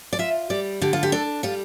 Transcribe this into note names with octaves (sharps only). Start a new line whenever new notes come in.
D5
F4 E5
G3 D5
D3 G4
F4
G4
D4 A4
G3 F4